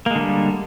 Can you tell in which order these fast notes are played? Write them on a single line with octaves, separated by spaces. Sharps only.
A#3 G#3 D3 G3